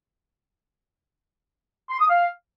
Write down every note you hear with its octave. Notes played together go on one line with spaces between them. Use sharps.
C6
D#6
F5